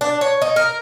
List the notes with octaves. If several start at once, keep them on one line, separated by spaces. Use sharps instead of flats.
D4
C#5
D#4
A#4